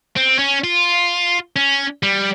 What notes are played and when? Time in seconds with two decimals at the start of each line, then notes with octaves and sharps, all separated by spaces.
0.16 C4
0.39 C#4
0.64 F4
1.56 C#4
2.03 G3